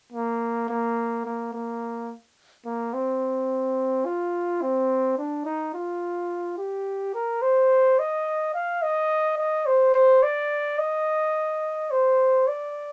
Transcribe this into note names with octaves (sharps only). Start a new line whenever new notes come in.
A#3
A#3
A#3
A#3
A#3
C4
F4
C4
D4
D#4
F4
G4
A#4
C5
D#5
F5
D#5
D#5
C5
C5
D5
D#5
C5
D5